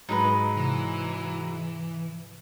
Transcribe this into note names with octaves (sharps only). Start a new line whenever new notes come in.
G#2 F#3 G#3 D#4 B4
C3 E3